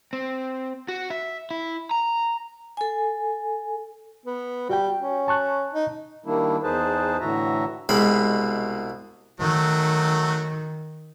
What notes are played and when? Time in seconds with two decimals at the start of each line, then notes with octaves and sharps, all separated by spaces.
0.13 C4
0.88 F#4
1.10 E5
1.51 E4
1.91 A#5
2.77 A4 G#5
4.26 B3
4.69 G3 F#4 G5
5.00 C#4
5.28 A5 C#6 F#6
5.73 D#4
6.26 D#3 G3 A#3 D4 E4
6.63 E2 D#4 G#4 B4 C5 A5
7.20 A2 D3 E3 F#4 E5 A#5
7.89 C2 B2 G#3 B5
9.40 D#3 F#3 A3